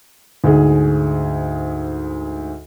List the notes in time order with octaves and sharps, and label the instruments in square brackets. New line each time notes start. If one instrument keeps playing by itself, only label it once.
[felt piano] D2 G#2 G#4